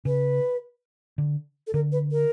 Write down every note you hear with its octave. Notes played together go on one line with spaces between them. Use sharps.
C#3 B4
D3
A4
D3 A#4
B4
A#4